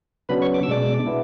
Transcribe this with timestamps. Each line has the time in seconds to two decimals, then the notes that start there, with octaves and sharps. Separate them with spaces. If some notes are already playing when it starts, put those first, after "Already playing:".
0.29 C#3 F#3 B3 D4 B4 B5
0.42 C#5 C#6
0.54 D6
0.63 E6
0.68 B2 G#3 D4 D5 D6
1.07 B3 E4